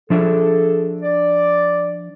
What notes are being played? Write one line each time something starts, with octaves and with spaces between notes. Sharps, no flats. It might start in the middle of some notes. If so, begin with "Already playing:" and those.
F3 D4 G#4 A4 E5
D5